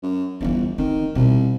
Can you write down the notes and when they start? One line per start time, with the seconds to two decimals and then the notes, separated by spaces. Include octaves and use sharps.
0.03 F#2
0.41 G1 E2 E3
0.78 D#3 C4
1.15 C2 B2